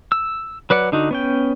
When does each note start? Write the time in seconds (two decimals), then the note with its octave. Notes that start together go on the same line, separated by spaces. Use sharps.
0.12 E6
0.70 F#3 B4 D5 F#5
0.92 D3 D#4 F#4
1.11 B3 C#4 G5